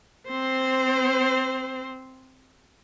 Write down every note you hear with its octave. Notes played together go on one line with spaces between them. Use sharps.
C4 C5